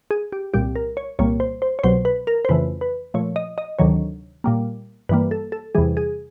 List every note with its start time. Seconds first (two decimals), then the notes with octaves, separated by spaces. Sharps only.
0.11 G#4
0.32 G4
0.54 C2 A#2 G3 G4
0.76 A#4
0.97 C#5
1.19 C2 A#2 G3 A#3 C#5
1.40 C5
1.62 C5
1.79 C#5
1.83 C2 B2 F#3 C5
2.05 B4
2.27 A#4
2.45 C5
2.49 F2 C#3 E3 A3 B4
2.81 B4
3.14 A#2 F3 A3 C#5
3.36 D#5
3.58 D#5
3.79 D2 C3 D#3 F#3 C#5
4.44 A#2 G3 A#3
5.09 G2 E3 G3 A#3 B4
5.31 A4
5.52 A4
5.75 E2 C3 E3 G3 G#4
5.97 G#4